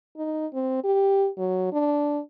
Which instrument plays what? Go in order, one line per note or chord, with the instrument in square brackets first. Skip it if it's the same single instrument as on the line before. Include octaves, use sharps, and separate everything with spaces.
[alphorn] D#4
C4
G4
F#3
D4